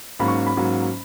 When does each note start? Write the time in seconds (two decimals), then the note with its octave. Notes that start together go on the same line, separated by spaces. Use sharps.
0.20 G#2 F#3 A#3 C#4 B5
0.28 C#6
0.47 B5
0.57 G#2 F#3 A#3 C#4